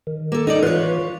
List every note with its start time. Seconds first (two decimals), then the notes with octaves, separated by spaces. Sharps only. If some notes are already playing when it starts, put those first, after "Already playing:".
0.07 D#3
0.32 A#3 A4
0.47 D#4 A4 D5
0.63 E3 F4 B4 C#5